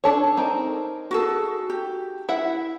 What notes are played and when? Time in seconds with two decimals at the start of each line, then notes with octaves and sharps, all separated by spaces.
0.04 D4 A4 C#5
0.37 C4 D#4 A#4
1.11 F#4 G#4 A4
1.70 G4
2.29 E4 E5 F#5